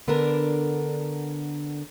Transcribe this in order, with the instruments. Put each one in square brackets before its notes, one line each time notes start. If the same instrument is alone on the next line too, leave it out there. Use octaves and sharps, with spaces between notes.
[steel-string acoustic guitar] D3 B3 D4 A4 A#4